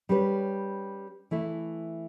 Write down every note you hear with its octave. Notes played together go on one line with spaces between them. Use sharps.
G3 C#4 G4 B4
E3 A3 E4